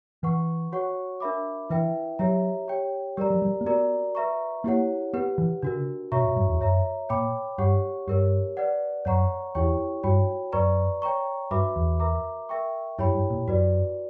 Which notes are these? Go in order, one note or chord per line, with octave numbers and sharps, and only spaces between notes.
E3 B4 F#5 C#6
F#4 C#5 F#5 C#6
D4 A#4 E5 B5 D6
E3 E4 B4 E5 G5
F#3 G4 C#5 E5 A#5
G4 C#5 G5
G3 G4 A#4 D5 A#5
F#3
G3
A#3
B3 F#4 A#4 D5 A#5
B4 E5 A#5 C#6
A#3 E4 G4 C#5 F#5
B3 G4 B4 F#5
E3
C#3 D4 F#4 A#4
B2 F#4 C#5 E5 A#5 C#6
A#2
G2
E2
F#2 C#5 E5 A#5
A#2 C#5 G5 B5 D6
G2 G4 C#5 F#5 C#6
G2 G4 A#4 C#5
B4 D5 F#5
F#2 C#5 F#5 A#5 C#6
E2 E4 G4 C#5 G5 C#6
G2 F#4 C#5 G5 B5
F#2 B4 D5 A#5 C#6
C#5 G5 A#5 C#6
G2 F#4 B4 E5 B5 D6
E2
A#4 E5 A#5 D6
A#4 E5 G5 C#6
F#2 E4 G4 C#5 G5 B5
G2
A#2
F#2 F#4 B4 D5